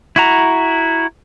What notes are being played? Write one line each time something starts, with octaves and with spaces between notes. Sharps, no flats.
E4 F#4 A#5